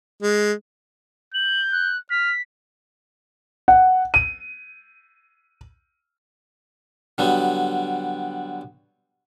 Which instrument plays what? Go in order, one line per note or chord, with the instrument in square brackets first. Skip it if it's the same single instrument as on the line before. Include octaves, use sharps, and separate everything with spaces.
[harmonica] G#3
[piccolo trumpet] G6 [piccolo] F#7
[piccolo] F#6
[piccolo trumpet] F6 [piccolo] B6
[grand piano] F#5
D#7
[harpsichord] D3 F#3 G3 B3